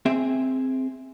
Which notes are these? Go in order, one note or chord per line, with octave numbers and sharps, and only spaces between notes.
C4 G#4 E5